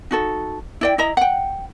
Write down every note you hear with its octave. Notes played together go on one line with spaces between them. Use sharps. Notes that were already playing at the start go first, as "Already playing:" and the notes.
D#4 F#4 A4
E4 D5 G5
E4 D#5 A#5
F#5 G5